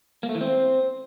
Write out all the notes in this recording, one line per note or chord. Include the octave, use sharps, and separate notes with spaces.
A#3
A3
E3
C4